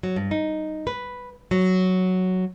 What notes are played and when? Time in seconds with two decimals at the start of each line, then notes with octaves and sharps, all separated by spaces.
0.03 F#3
0.16 G2
0.31 D#4
0.87 B4
1.51 F#3